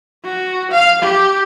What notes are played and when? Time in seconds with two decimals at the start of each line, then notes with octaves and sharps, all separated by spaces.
0.25 F#4
0.72 F5
1.02 G4